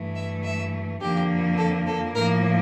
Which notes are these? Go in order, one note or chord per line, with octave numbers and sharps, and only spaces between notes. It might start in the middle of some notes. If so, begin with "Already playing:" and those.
Already playing: G2 E3 A3
E5
E5
F2 D3 F3 A#3 G4
A4
A4
A2 F3 A#3 A#4